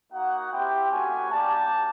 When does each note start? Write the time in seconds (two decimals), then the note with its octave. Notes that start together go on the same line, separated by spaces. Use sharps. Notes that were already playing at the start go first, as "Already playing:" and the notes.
0.13 A#3 D#4 F#4 F#5
0.52 C4 E4 G4 G5
0.92 A3 C#4 F#4 G#5
1.31 A#3 D4 G4 A5